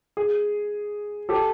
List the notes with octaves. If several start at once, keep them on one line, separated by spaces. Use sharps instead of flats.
G#4
G4 A4